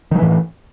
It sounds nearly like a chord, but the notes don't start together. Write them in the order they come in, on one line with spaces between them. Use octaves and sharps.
D#3 F#3 E3 A2